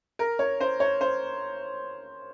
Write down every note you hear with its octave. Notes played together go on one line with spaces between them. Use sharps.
A#4
C#5
C5
C#5
C5